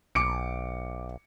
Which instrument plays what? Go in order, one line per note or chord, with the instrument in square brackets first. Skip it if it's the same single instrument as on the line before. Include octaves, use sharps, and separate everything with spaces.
[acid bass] B1 [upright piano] D6 C#7 D7